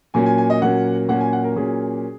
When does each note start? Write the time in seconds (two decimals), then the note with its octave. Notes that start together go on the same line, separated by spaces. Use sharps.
0.14 A#2 F#3 A#3 C#4 G#5
0.26 G#5
0.38 G#5
0.50 D#5
0.62 A#2 F#3 A#3 C#4 F#5
1.09 A#2 F#3 A#3 C#4 F#5
1.21 G#5
1.33 F#5
1.44 A#4
1.56 A#2 F#3 A#3 C#4 G#4